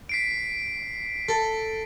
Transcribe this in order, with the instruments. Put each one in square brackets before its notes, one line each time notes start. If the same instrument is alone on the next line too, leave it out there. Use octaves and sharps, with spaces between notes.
[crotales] B6 C7 D7
[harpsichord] A4